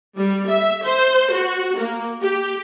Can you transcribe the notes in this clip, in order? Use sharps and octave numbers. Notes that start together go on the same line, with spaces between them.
G3
E5
C5
F#4
A#3
G4